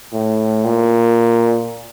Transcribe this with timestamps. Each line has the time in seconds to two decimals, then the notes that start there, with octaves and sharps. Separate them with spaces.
0.13 A2
0.64 A#2